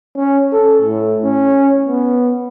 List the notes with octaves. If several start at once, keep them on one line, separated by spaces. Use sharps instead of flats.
C#4
A4
A2
C#4
B3